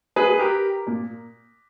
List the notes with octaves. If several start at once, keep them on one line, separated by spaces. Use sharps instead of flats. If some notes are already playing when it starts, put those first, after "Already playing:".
G#4 B4
G#4
G4 A#4
A#2